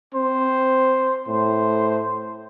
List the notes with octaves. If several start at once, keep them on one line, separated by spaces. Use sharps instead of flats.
C4 C5
A2 C5